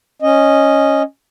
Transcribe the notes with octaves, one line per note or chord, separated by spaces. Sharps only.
C#4 D#5